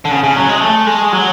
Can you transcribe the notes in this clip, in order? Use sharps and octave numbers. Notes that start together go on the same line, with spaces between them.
D3
C#3
C#3
F#3
G#3
A3
G#3
F#3